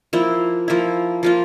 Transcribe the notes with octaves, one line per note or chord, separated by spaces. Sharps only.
F3 A#3 E4
F3 A#3 E4
F3 A#3 F4